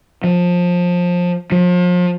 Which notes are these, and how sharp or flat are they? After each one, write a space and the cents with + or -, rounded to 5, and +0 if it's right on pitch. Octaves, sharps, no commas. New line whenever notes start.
F3 +20
F3 +35